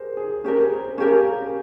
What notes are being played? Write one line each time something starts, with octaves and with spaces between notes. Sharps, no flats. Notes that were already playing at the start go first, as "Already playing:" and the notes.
Already playing: G4 G#4 A#4 C5
G#4
C#4 G4 G#4 A#4
G#4
C5
C#4 G4 A#4 F5
G#5